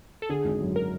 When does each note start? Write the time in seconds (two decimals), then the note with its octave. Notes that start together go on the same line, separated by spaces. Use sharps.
0.22 A4
0.29 D3 G#4
0.45 G#1
0.61 F#2
0.76 A#4